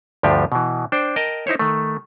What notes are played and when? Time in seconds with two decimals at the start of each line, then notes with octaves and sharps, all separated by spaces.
0.23 D2 G2 F3 D4 G4 G#5
0.52 B2 E3
0.92 D4 C5 G5
1.16 A#4 D#5 G5 A5
1.47 D#4 E4 C5 C#5
1.59 D#3 A3